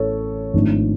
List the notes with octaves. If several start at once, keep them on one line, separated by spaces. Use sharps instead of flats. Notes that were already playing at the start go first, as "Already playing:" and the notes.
Already playing: A1 A2 A4 C#5
G#1 G#2 F3 A3 D4